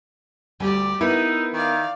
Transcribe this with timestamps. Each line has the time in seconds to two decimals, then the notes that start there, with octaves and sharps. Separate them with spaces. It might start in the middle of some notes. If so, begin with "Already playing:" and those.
0.60 D2 G3 G4 D5 G#5
1.01 B3 D#4 E4 A#4 B4
1.54 D#3 D5 F5